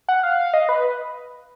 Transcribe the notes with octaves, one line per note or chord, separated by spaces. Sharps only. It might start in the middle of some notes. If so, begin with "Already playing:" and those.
F#5
F5
D#5
B4